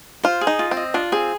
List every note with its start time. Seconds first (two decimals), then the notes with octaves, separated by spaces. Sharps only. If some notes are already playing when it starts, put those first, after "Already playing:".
0.23 F4 C5
0.41 G#4
0.47 D#4
0.59 F4
0.71 C4
0.77 D#5
0.94 D4 F4
1.12 C4 G#4